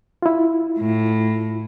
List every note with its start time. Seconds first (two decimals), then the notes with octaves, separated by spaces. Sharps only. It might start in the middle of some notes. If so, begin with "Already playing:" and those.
0.22 E4 F4
0.79 A2